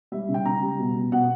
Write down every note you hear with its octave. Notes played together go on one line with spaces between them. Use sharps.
G3 E5
C#3
G5
C#3 A#5
G3
B2
B2
B2 F#5